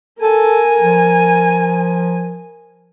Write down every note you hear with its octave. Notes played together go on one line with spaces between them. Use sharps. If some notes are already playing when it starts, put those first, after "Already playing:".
A4 A#4 G#5
F3